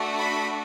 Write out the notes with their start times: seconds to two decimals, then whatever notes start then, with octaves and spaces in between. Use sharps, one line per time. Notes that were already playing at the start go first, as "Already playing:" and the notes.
Already playing: A3 D4 F#4
0.16 B5